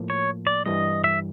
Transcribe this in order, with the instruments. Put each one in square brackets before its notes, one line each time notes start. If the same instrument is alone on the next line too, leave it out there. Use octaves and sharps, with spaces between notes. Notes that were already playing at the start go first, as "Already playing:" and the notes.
Already playing: [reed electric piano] A2 F3 A#3
[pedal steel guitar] C#5
D5
[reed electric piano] G2 E3 G3 [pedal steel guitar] D#5
[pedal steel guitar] E5